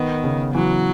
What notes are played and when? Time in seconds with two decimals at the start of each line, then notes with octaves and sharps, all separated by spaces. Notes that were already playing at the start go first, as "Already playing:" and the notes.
Already playing: D#3 B3
0.24 C#3
0.54 E3 F#3